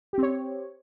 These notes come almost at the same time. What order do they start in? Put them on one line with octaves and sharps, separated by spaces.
G4 C4 C#5